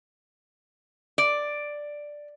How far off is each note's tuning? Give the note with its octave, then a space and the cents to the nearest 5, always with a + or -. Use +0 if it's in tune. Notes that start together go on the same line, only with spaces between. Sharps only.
D5 +5